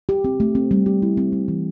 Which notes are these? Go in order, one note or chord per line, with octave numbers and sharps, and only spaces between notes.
G4
C4
A3
C4
G3
G4
E4
C4
G3
E3